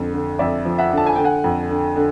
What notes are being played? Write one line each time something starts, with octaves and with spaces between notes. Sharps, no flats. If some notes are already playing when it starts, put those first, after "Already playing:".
Already playing: F2 D3
D3
F2 D5 E5
F3
E5 F#5
D3
A5
G#5
D3 G5
F#5 G#5
F2
D3
D3